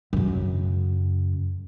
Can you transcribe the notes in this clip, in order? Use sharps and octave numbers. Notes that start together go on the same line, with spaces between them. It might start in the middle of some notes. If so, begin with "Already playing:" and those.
F#2 C#3